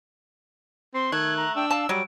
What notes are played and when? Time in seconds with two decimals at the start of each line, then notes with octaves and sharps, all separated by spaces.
0.94 C4 C6
1.12 D#3 A3 F#6 G#6
1.37 A#5
1.56 D4 G5 E6
1.71 F5 A5
1.89 F#3 G3 D7